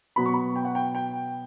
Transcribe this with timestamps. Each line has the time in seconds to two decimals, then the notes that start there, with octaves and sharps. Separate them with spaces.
0.16 B2 F#3 B3 B5
0.26 C#6
0.34 B5
0.56 G5
0.65 F#5
0.75 G5
0.95 G5